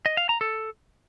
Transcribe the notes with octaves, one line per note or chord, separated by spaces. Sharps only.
D#5
F5
A#5
A4